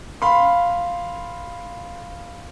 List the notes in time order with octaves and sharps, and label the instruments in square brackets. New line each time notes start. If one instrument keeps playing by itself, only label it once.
[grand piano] F5 B5 C6